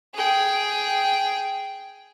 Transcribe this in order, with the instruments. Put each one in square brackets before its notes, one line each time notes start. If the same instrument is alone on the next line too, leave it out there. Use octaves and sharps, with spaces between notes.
[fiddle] G#4 G5